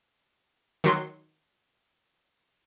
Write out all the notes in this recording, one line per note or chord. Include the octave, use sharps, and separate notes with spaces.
D#3 F#3 C6